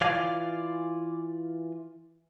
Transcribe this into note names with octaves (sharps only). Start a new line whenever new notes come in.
E3 F4 D5 F5 G#5